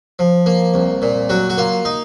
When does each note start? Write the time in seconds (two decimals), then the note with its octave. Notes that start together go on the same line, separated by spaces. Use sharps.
0.19 F3
0.46 A#3
0.74 C2
1.02 A#2
1.29 F#3 F#4
1.50 F#4
1.57 A#3 F4
1.85 D#4